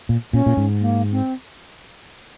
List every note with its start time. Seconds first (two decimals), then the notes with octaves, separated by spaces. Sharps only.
0.09 A#2
0.33 A#2 C#4
0.46 A#2
0.57 G#2
0.81 A#3
1.11 C4